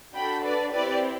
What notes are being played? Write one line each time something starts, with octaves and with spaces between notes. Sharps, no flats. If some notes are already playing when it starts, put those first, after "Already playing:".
D4 F#4 A4 G5 B5
B4 D5
C4 E4 G4 B4 D5